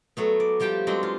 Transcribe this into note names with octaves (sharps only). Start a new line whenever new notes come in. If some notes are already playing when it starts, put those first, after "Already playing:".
F#3 A3 B3
D5
F3 G3 G4 G5 A5
F#3 G#3 C4 D4
F4